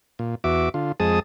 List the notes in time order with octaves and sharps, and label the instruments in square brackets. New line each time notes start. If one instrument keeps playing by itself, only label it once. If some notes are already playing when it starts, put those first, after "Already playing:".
[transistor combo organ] A#2
E2 F#4 E5 D6
D3 F4
F2 G#3 G#4 A5 D#6